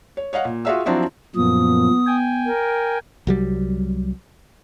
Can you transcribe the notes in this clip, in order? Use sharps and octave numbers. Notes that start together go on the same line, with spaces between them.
C#5
C#5 D#5 F5 F#5
A#2
F4 F#4 G#4 E5 F5 E6
F3 F#3 C4 D4 E4 F#4
F#2 A#2 F3 B3 D#6
G5 G#5
A#4
C2 F#3 G3